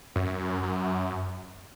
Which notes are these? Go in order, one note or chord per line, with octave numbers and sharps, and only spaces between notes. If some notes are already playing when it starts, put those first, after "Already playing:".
F#2
F#2